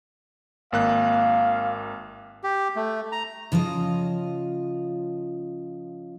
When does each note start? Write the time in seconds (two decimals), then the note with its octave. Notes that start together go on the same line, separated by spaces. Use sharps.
0.72 G#1 A#3 F5 F#6
2.44 G4
2.76 A3
3.12 A#5
3.52 C#3 F3 F4 D#5